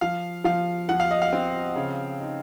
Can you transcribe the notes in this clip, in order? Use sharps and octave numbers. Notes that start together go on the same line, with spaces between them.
F3 F5
F3 F5
F3 F#5
F5
D#5
F5
C4
C#3
D#4